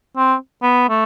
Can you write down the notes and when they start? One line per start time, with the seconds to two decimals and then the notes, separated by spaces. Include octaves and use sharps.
0.17 C4
0.62 B3
0.89 A3